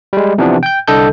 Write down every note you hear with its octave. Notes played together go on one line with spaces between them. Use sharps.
G3 G#3
C3 E3 F3 B3 D4
G5 G6
C2 D3 A4 D#5 A5 G6